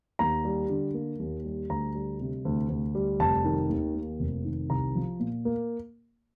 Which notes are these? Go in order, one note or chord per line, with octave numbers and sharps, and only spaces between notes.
D#2 A#5
G3
D3
A#3
D#2
G3
D2 A#5
G3
C3
D2
D2
G3
F1 A5
D#3
D#2
A#3
F1
D#3
C2 A#5
F3
A#2
A#3